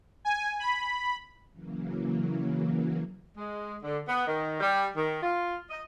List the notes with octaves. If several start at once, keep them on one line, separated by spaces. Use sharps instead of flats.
G#5
B5
C#3 E3 F#3 A#3
G#3
D3
B3
D#3
G3
D#3
F4
D#5